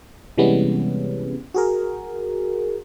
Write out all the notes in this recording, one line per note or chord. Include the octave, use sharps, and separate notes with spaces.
C3 E3 G3 G#3 B3 C#4
F#4 G#4 A#4